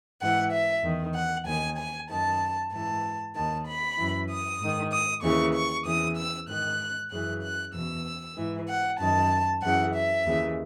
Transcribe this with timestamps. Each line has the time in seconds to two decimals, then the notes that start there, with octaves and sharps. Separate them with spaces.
0.21 G#2 E3 F#5
0.52 E5
0.84 E2 D#3
1.15 F#5
1.46 D#2 D#3 G#5
1.78 G#5
2.09 F#2 D#3 A5
2.72 G#2 E3 A5
3.35 D#2 D#3 A5
3.66 B5
3.98 F#2 E3
4.29 D#6
4.60 G#2 D#3
4.91 D#6
5.23 D#2 C#3 E3 C#6
5.54 C#6
5.85 E2 C#3 E3 D#6
6.17 E6
6.48 G#2 D#3 F#6
7.11 F#2 C#3 E3 F#6
7.43 F#6
7.73 E2 B2 E6
8.37 G#2 E3
8.68 F#5
8.99 F#2 D#3 A5
9.62 F#2 C#3 E3 F#5
9.93 E5
10.25 D#2 C#3 E3